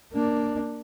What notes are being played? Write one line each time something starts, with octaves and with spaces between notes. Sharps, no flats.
A#3 D4